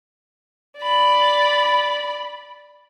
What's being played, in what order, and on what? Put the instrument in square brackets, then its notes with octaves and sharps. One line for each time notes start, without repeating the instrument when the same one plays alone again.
[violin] D5 B5